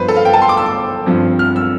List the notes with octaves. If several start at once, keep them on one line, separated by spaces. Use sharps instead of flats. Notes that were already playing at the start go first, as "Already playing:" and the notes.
Already playing: G2 F3 B3 B4 C5
A4
F5
G5
A5
C6
D6
E6
D6
G2 F3 C4
F6
E6